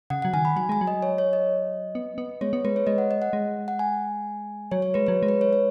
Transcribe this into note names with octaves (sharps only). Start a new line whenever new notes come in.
C#3 F#5
F#3 F#5
D#3 G#5
B5
F#3 G#5
G#3 G#5
F#3
D#5
C#5
C#5
D#5
B3
B3
G#3 C#5
B3
G#3 B4
C#5
G#3 D#5
F#5
D#5
F#5
G#3
F#5
G#5
F#3 C#5
C#5
G#3 B4
F#3 C#5
G#3
B4
C#5
C#5